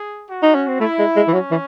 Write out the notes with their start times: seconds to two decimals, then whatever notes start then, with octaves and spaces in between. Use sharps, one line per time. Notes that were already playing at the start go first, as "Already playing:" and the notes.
Already playing: G#4
0.28 F#4
0.43 D#4
0.55 C#4
0.68 C4
0.80 A3 E4
0.99 G#3
1.16 G#3
1.28 E3
1.33 F#3 C#4
1.51 E3